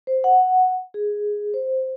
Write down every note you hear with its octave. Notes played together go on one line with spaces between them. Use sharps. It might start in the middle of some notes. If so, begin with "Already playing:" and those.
C5
F#5
G#4
C5